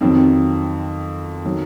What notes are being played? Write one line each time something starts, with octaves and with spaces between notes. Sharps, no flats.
F2 D#3 F#3 C4
D#3 F#3